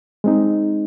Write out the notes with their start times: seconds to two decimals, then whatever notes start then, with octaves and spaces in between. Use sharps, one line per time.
0.24 G#3 C4 D#4